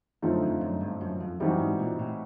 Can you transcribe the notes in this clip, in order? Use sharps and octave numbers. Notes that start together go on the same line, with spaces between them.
F#2 D3 F3 A3 C4 D#4
F2
F#2
G2
F#2
F2
F#2 E3 G3 C4 D#4 F#4
G#2
A#2
A2